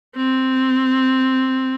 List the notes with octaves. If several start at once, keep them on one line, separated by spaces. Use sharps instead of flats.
C4